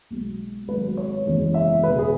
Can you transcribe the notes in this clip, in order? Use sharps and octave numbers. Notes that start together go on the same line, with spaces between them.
B1 B2 G#3
G#1 G#2 F#3 B4
C#5
F#1 E2 E3 G#3 C#4
E5
E1 E2 C#3 B4
G#4